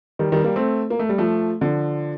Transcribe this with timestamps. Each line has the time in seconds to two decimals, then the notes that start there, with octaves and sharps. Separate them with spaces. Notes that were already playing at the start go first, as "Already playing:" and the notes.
0.19 D#3 G3
0.32 D#3 G3
0.44 G3 A#3
0.56 A3 C4
0.90 A#3
0.99 A3
1.09 G3
1.18 F3 A3
1.61 D3 F3